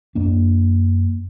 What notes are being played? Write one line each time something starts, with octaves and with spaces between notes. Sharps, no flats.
F#2 A#3 D4